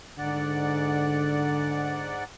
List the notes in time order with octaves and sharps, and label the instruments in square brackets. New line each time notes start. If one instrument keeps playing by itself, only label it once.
[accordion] G#2 D5 F#5 [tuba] D3